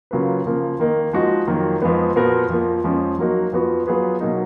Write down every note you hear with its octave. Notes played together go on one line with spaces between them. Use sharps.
C#3 F#3 A#3 F4 B4
C#3 F3 A#3
D#3 A#3 D#4
F3 G#3 D#4 F#4
F2 D#3 F#3 A#3
F2 F3 G#3 B3
A#2 F3 B3 F#4 A#4
F2 F3 A#3
F2 F3 G#3 C#4
F#3 A#3 D#4 F#4
F2 F3 B3 F#4
F#3 B3 F4 G#4 B4
B2 F#3 A#3 D#4